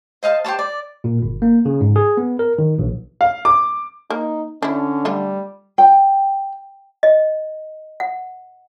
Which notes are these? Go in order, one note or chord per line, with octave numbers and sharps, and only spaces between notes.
C5 D#5 F5 A5
G4 C5 C#5 A5
D5
A#2
G1
A#3
C#3
G#2
G#4
B3
A#4
D#3
A#1
F5
D6
A#3 D#4
D3 C#4 D4 E4
G3 A3 F4
G5
D#5
F#5